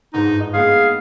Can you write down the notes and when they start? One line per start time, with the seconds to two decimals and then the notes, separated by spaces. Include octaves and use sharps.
0.13 G1 G#2 D#4
0.40 D#5
0.54 G#3 A#3 B3 G#4 F5